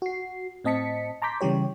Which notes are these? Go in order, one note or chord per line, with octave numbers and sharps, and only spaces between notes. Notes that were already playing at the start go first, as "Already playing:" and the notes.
F#4 C7
A2 C4 D#5 A5 B6 C#7
A5 A#5 C6 D6 G6 B6
C#3 E3 G3 G4 C#5